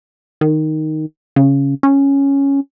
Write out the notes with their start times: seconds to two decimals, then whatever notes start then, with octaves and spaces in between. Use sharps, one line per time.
0.41 D#3
1.36 C#3
1.83 C#4